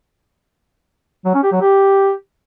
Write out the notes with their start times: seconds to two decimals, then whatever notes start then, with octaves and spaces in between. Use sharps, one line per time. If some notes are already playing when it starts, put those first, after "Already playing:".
1.25 F#3
1.34 C#4
1.43 G4
1.52 F#3
1.61 G4